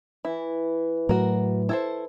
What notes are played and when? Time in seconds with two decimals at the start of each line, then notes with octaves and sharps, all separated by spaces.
0.25 E3 E4
1.09 A2 F#3 F#4 A#4
1.69 E4 A4 C5